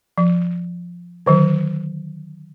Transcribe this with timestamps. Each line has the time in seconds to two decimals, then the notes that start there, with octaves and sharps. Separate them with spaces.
0.18 F3
1.26 D3 D#3 F#3